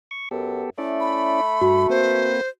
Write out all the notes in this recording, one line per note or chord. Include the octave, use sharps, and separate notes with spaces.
C#6
F#2 B3 G4 A4
A3 C#4 E4 D5
B5
G2 F#4
A#3 C4 B4 C5